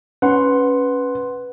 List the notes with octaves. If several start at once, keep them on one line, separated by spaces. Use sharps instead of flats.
C#4 B4 F#5 C6